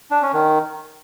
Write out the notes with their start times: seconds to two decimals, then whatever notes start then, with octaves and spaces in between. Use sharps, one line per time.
0.11 D4
0.22 C#4
0.34 D#3